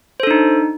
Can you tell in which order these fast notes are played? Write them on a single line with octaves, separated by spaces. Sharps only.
C5 A4 D4 D#4